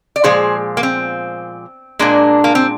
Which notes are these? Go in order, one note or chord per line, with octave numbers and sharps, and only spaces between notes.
D5
A#2 F3 G#3 G#4 C5
A#3
C4
A#2 G#3 A#3 D4
A#3
C4